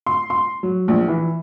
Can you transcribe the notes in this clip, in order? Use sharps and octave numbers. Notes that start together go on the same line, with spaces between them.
C6
C6
F#3
A#1
E3